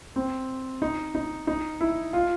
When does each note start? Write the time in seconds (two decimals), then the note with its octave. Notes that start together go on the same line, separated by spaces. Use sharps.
0.16 C4
0.82 D#4
1.15 D#4
1.47 D#4
1.80 E4
2.13 F4